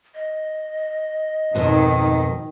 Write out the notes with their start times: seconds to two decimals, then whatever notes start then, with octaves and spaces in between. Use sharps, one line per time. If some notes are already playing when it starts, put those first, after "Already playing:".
0.15 D#5
1.55 F2 G#2 B2 D#3